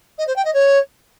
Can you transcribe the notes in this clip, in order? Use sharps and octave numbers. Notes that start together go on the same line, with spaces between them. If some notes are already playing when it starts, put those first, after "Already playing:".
D#5
C5
G5
D#5
C#5